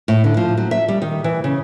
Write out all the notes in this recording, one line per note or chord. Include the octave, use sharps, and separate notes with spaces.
A2
D3
F3
F#3
E5
G3
D#3
E3
C#3